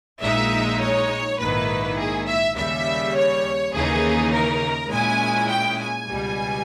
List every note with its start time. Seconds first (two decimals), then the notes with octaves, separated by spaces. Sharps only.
0.22 A#1 A#2 G#3 D#4 E5
0.80 C#5
1.39 A#1 G#2 D#3 A#3 E4 B4
1.98 G#4
2.27 E5
2.56 D#2 C#3 G3 E5
3.14 C#5
3.73 D#2 C#3 E3 A#3 D#4 G#4
4.32 A#4
4.90 A#2 G#3 C#4 E4 G#5
5.48 G5
5.78 G#5
6.08 C#2 B2 G3